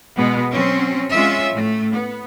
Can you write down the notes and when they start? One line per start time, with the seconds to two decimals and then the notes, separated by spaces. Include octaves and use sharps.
0.16 B2 G#3 B3
0.52 F#3 C4 C#4
1.12 G#3 C#4 F4 E5
1.54 A2 A3
1.94 B3